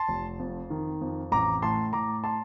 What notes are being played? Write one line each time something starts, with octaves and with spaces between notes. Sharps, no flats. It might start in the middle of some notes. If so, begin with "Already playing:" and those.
Already playing: A5 C6
F1
F2
D#3
F2
A1 A#5 D6
A2 A5 C6
A2 A#5 D6
A5 C6